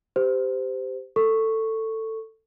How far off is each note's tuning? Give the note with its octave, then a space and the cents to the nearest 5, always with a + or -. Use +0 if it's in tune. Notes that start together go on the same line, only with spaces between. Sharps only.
G4 +0 C5 -25
A4 +15 C#6 -5